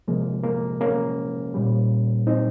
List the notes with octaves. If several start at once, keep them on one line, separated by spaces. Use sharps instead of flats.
C3 F3 G#3 A#3
A#3
A#3 C#4
A#2 G3
C4 D#4